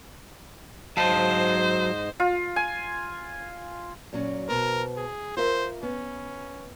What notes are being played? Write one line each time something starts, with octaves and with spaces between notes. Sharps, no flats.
G#2 F#3 C5 D#5 F5 A5
F4
G#5
A#2 F#3 C#4
B2 B3 A#4 C5
G#4
F4 A#4 C5 E5
B3 C#4